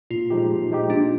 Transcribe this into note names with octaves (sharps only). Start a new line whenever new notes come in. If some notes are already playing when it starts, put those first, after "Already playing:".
A#2 F4
F3 G#3 D#4 G4
A#2
F3 G#3 D#4 G4
A#2 D4